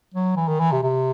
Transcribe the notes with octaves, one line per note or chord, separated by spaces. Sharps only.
F#3
E3
D#3
E3
C3
C3